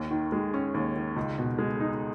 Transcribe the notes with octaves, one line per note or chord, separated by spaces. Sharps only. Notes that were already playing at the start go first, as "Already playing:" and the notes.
Already playing: D#2
D#3
G#3
C#4
D#2
D#3
C#2
B2
G#3
D#4